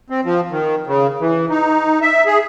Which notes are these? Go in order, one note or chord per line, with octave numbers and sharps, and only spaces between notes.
C4
F3
D#3
C#3
E3
D#4
E5
G#4